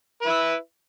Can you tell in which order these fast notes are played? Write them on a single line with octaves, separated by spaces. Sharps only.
B4 E4 E5